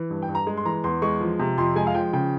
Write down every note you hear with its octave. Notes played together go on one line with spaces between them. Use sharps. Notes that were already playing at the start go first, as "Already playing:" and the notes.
Already playing: E3
G2
G5
G2
A#5
G#3
C6
E3 A#5
E2 C6
G#3 C#6
F3
C3
F2 C6
G#3 G#5
F5
F3 G5
C#3 G5